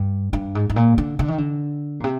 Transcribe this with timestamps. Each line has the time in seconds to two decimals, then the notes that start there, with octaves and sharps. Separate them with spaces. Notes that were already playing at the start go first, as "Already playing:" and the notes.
Already playing: G2
0.33 G2
0.55 G#2
0.70 G#2
0.76 A#2
0.98 D3
1.19 D3
1.28 D#3
1.38 D3
2.00 A#2
2.04 C3